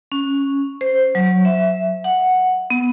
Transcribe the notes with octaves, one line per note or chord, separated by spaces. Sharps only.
C#4
C5
F#3
E5
F#5
B3